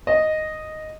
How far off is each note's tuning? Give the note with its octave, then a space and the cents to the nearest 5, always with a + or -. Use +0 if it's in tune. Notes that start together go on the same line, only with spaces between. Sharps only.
D#5 +0